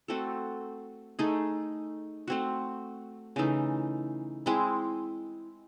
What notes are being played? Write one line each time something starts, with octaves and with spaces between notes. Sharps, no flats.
A3 C4 F#4 A4
A3 D#4 G#4
A3 C4 F#4
C#3 E3 A3 D#4
G#3 C4 E4